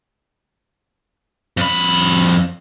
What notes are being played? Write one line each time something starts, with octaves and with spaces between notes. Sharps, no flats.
F2 B5